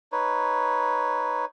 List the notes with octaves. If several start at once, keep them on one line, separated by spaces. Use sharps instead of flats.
D#4 B4 C#5